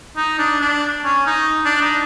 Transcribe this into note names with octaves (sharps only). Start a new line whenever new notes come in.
D#4
D4
D4
C#4
D#4
D4
D#4